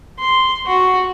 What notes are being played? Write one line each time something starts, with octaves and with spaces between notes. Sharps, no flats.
C6
F#4